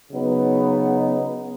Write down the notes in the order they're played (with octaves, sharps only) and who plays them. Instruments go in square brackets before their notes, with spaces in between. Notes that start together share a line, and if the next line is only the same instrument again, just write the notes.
[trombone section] C#3 F#3 B3 D#4